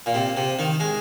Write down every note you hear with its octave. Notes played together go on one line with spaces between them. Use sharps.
A#2
C3
C3
D#3
G#3